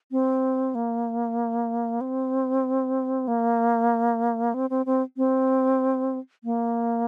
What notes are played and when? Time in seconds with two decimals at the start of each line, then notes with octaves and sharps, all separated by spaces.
0.11 C4
0.75 A#3
2.01 C4
3.28 A#3
4.54 C4
4.70 C4
4.86 C4
5.17 C4
6.44 A#3